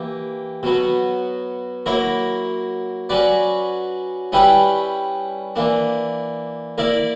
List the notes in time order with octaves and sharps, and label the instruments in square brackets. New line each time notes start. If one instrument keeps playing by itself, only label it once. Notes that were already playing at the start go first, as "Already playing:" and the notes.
Already playing: [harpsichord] E3 A#3 G4
B2 F#3 B3
F#3 A#3 E4 A#4
F#3 C#4 F#4 B4 D5
G3 C#4 E4 G4 B4
E3 A#3 D4
A#3 E4 A#4 D5